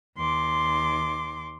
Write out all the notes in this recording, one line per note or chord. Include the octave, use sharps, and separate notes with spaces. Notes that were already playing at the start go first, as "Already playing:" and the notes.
D#2 C6 D6